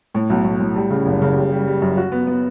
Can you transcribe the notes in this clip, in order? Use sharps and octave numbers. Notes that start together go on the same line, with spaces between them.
A2
B1
A2
A2
G3
C#3
F#1
C#3
G3
G3
G3
F#2
F#4
B3
B3